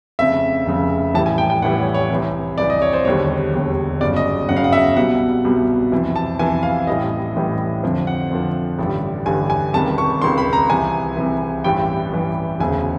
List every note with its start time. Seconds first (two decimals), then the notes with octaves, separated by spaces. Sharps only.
0.19 F1 F2 C#3 E5
0.66 F1 F2 C#3
1.14 A1 A2 E3 G3 A5
1.26 G#5
1.38 G5
1.50 G5
1.62 A1 A2 E3 G3 F#5
1.79 C#5
1.94 C#5
2.10 C2 C3 E3
2.58 C2 C3 E3 D5
2.70 D#5
2.82 C#5
2.93 C5
3.05 E1 D#2 D3 G3 C#5
3.53 E1 D#2 D3 G3
4.01 G1 F#2 C#3 D5
4.16 D#5
4.49 G1 F#2 C#3 F#5
4.57 F5
4.64 F#5
4.73 E5
4.96 C2 B2 G3 F#5
5.45 C2 B2 G3
5.92 F2 C3 E3
6.16 A5
6.39 F2 C3 E3 G#5
6.63 F5
6.87 A1 A2 E3 G3 D#5
7.35 A1 A2 E3 G3
7.83 F2 D3 F3
8.07 F#5
8.30 F2 D3 F3
8.79 A1 G2 D3 G3
9.25 A1 G2 D3 G3 G#5
9.50 G#5
9.73 C#2 C3 D#3 G3 A5
9.98 C#6
10.22 C#2 C3 D#3 G3 C6
10.38 B5
10.53 A#5
10.69 C2 C3 E3 G#5
11.17 C2 C3 E3
11.64 A1 G2 E3 G3 G5
12.12 A1 G2 E3 G3
12.60 E1 D2 C#3 G#5